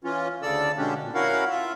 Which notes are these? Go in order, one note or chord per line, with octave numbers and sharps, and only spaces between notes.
E3 C#4 F4
D2 C#3 A4 D5 E6
B2 D3 G#3 C#4 D4 G4
A#2
C#4 E4 F#4 A#4 F5 F#5
F4 E5